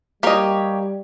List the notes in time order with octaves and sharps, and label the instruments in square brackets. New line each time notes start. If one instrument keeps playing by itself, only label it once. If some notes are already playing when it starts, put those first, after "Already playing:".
[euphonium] G3 [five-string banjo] A#3 D#5 [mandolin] G4 C#5